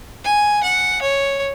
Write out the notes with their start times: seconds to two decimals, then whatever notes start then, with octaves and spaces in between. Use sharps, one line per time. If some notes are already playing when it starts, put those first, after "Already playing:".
0.25 G#5
0.63 F#5
1.02 C#5